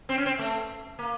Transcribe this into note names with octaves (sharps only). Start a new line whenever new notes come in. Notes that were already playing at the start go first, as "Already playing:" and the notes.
C4
C#4
C4
A3
A#3